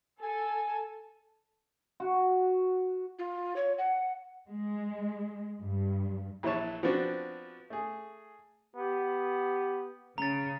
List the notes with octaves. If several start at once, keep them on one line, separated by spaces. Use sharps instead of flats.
A4 G#5
F#4
F4
C#5
F#5
G#3
G2
A#1 E3 E4 C#5 A5
F3 B3 C4 D4 F#4
A3 G#4
B3 G4
C#3 A#5 A6